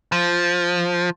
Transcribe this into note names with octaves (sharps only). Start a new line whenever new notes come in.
F3